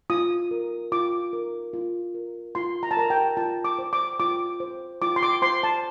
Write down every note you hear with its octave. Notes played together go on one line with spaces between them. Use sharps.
F4 D#6
A#4
F4 D6
A#4
F4
A#4
F4 C6
A#5
A5
A#4 A#5
G5
F4 A5
D6
C5
D6
F4 D6
C5
F4 D6
C6
D6
C5 C6
A5